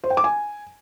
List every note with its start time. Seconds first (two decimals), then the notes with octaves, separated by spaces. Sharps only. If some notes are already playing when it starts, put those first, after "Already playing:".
0.04 C5
0.10 G5
0.17 D6
0.24 G#5